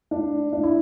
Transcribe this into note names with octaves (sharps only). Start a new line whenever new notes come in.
D4
D4
E4